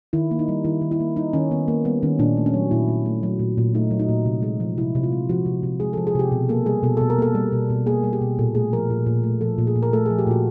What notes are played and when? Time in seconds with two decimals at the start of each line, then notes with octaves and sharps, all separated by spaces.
0.13 D#3 E4
0.31 A#3
0.39 D#4
0.48 G3
0.64 D#3 E4
0.82 D#3
0.91 E4
1.00 A#3
1.16 G3 D#4
1.33 D#3 C#4
1.51 D#3 B3
1.68 A#3
1.85 G3 B3
2.03 D#3 C#4
2.19 A#2 D4
2.37 A3
2.46 C#4
2.54 F#3
2.71 A#2 E4
2.88 A#2
3.06 A3
3.23 F#3
3.39 A#2
3.58 A#2
3.74 A3 D#4
3.91 F#3
3.99 D#4
4.09 A#2
4.25 C3
4.42 G#3
4.60 F3
4.78 C3 E4
4.95 C3
5.03 F4
5.12 G#3
5.29 F3 F#4
5.46 C3
5.63 C3
5.80 G#3 G#4
5.93 F3 A4
6.07 G#4
6.15 C3 G4
6.32 B2
6.49 A#3 A4
6.66 G3 G#4
6.83 B2 A4
6.97 B2 A4
7.10 A#4
7.18 A#3 A4
7.35 G3
7.52 B2
7.70 B2
7.86 A#3 G#4
8.04 G3
8.13 G4
8.21 B2
8.39 A#2 A4
8.55 A3 G#4
8.73 F3 A#4
8.90 A#2
9.06 A#2
9.24 A3
9.41 F3 A4
9.58 A#2
9.67 G#4
9.76 A#2
9.83 A#4
9.93 A3 A4
10.06 G#4
10.10 F3
10.18 G4
10.27 A#2 F#4